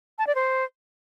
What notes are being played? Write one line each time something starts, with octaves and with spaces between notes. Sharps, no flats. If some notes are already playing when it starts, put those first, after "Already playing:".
A5
D5
C5